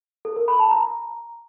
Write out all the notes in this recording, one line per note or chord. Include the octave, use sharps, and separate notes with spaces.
A4
A#4
B5
A5
A#5